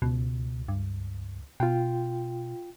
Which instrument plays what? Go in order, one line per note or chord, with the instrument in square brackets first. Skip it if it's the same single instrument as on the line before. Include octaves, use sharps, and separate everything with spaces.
[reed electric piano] C#2 [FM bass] B2
[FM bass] G2
[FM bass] B2 [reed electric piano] F4 G5